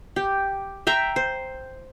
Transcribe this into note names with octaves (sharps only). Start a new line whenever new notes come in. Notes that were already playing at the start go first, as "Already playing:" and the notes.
G4
E5 G5 A#5 C6
C5